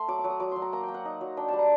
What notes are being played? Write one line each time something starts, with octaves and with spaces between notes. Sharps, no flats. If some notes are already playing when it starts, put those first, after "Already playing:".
Already playing: A3 C6
F#3 D6
D6
F#3
D#6
F#3 D6
F#3 C6
A#5
A#3 A#5
A#3 G5
F#5
D#4
F#3
D4 G5
G3 A5
A#5